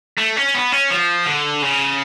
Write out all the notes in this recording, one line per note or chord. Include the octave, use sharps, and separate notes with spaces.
A3
C#4
B3
C#4
F3
D3
C#3